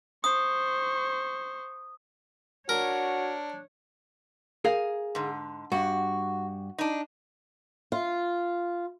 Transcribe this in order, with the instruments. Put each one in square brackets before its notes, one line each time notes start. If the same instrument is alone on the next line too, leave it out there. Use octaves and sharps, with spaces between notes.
[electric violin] C5 C#6 [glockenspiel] D#6
[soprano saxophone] D4 [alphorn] F#4 [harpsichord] A#4 [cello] C#5
[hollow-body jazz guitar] G#4 A#4 F5
[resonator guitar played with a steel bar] G#2 D3
[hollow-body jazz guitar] G2 [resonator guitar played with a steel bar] F#4
[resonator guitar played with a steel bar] D4 D#4
[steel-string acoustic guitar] F4